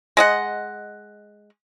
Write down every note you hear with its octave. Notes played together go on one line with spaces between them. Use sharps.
G#3 D#5 F#5